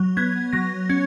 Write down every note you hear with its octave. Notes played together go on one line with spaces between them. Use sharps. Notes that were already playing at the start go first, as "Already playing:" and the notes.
Already playing: F#3
B3 G#6
F#3 A#6
C#4 G#6